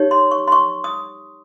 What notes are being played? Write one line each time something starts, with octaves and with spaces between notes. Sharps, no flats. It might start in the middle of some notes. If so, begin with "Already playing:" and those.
Already playing: D#4 G4 C#5
C6
C#6
C6
C#6
D#6